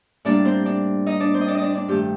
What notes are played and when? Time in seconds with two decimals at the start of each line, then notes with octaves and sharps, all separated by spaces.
0.25 A2 G3 A#3 D4 D5
0.45 C4 C5
0.66 D4 D5
1.06 D#4 D#5
1.20 D4 D5
1.34 C4 C5
1.41 D#5
1.48 D4 D5
1.55 D#5
1.61 D4 D5
1.75 D4 D5
1.88 G2 D#3 A3 G4